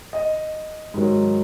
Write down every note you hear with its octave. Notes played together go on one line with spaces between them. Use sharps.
D#5
G#2 D#3 F#3